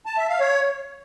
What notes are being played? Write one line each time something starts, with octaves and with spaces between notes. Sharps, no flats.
A5
E5
F5
C#5